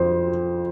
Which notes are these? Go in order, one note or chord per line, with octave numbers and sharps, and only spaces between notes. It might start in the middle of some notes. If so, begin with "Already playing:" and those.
Already playing: F2 C5